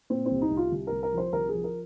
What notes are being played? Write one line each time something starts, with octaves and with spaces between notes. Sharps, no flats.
A#2 C4
C4
C2
D#4
C2
F4
C2
C2 A#4
A#4
F3 C5
C2 A#4
G#4
F3
A#4